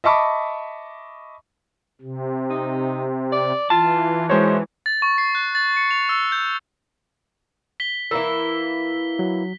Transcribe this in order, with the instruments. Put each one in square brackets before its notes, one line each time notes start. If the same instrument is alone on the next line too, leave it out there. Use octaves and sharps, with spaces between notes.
[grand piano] D#5 E5 A5 B5 C#6 D6
[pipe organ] C3
[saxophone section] D#4
D5
[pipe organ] E3 [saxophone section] F4 [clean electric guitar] A5
[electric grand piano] G#3 C5 C#5 [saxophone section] C#4 D#4 F#4
[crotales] A6
C#6
C7
F#6
A6
C#7
F7
E6
G6
B6 G7
[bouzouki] E3 A#3 E4 [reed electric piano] A#4 E6
[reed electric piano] F#3